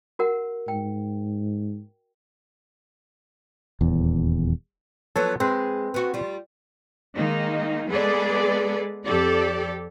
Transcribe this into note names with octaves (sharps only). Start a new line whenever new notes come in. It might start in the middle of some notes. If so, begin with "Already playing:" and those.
F#4 A#4 F#5
G#2 G5
D#1 E2
F3 F#3 B3 A4 C#5
G#3 C4 B4
B3 F#4
G3 F4
D#3 G#3 A#3 D#4
G#3 B3 G#4 A4 B4 D5
F2 G4 A4 D5